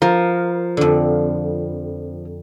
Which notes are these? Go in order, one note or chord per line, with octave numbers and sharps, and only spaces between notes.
F3 A#4
F2 D3